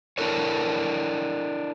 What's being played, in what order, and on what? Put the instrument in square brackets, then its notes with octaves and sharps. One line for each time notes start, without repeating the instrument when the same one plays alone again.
[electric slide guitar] D4 E4 A4 A#4 C#5